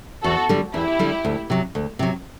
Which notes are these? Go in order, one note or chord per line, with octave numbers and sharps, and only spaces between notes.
E2 F#4 A4
D3 G3
E2 E4 G4
D3 G3
D2
C3 F#3
D2
C3 F#3